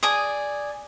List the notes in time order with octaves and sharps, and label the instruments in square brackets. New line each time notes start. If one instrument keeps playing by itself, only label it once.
[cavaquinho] G#4 D5 D#6